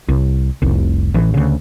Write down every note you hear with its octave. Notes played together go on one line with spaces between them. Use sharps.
C2
F1 C2
A1 E3
D2 C#3